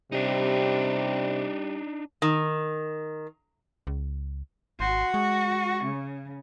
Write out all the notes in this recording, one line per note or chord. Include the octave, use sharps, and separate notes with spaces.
C3 G3 D4 D#4
D#3
C#2
G#1 F#4 C6
G#3 C#6
C#3